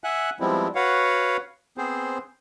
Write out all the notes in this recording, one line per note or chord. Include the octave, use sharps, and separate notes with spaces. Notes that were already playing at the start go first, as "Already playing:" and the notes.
E5 F#5 G#5 F#6
F3 G3 G#3 B3 C4 E4
F#4 B4 C#5 F5 F#5
B3 C4 G#4 C5